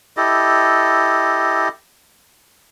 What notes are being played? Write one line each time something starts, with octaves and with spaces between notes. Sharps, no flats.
E4 G4 A4 D#5